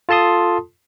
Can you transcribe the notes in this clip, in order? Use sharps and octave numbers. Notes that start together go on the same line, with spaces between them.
F4 A4 A5 C6 D#6